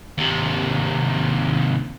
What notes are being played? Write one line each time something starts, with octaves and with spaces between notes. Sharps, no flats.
D#2 C3